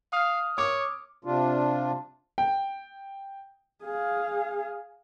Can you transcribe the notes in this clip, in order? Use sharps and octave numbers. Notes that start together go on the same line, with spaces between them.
F5 D#6 F6
C#5 D6
C3 D4 F4
G5
G#4 F5